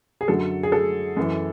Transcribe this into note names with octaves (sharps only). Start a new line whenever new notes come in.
G#4
F#2 D3 F#3 A4
G#4
A4
F#2 E3